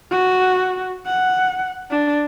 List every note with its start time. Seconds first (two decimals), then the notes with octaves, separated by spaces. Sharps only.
0.11 F#4
1.07 F#5
1.90 D4